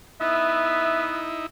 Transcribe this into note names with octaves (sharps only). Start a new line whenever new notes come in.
B3 D#4 E4 E5